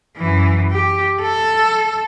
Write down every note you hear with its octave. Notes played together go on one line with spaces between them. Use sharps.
F#2 E3
G4
A4